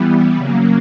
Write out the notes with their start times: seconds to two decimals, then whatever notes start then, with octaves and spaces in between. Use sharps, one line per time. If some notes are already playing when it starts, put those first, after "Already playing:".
Already playing: E3 G3 B3
0.36 C#3 F#3 A#3